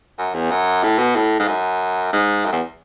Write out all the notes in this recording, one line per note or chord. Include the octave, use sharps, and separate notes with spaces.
F#2
E2
F#2
A2
B2
A2
G#2
F#2
G#2
F#2
E2